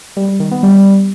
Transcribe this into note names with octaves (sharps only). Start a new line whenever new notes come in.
G3
G3
D#3
B3
G3